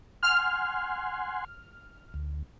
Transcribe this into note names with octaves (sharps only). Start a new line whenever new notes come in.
F#5 G#5 C6 F6
D2